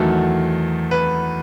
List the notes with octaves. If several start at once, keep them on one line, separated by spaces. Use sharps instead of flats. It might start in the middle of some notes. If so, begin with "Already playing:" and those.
Already playing: E2 D#3 F#3 A3 F#4 A4
B4